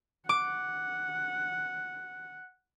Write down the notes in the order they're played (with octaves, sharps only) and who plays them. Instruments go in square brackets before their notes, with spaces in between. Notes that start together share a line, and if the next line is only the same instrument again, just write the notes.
[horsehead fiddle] F#5 [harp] D6